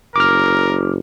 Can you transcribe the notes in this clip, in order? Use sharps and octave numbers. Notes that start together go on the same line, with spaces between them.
F#1 A#4 D6 F6